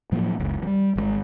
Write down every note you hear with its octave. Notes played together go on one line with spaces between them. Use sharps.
A2 F3 F#3 A#3
F#1 C#2
F3 G3
G#1 D#3 G#3